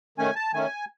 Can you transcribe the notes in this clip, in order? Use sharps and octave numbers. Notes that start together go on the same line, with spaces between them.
D#3 A3 C#4 G#5
A5
D#3 A3 C#4 G#5